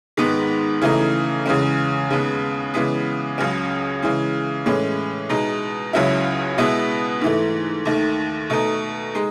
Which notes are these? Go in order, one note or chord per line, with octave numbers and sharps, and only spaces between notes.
G#2 D#3 G#3 B3
C#3 E3 A3 D#4
E2 C#3 G#3 C#4
D#2 C#3 G#3 B3
C#3 E3 G#3 B3
C#2 C#3 F#3 C#4
C#3 E3 G#3
A2 E3 G#3 C#4
B2 G#3 D#4
C#2 C#3 F#3 C#4 E4
B2 G#3 B3 E4
G#2 E3 A3
D#2 D#3 A3
B2 A3 D#4
G#3 D#4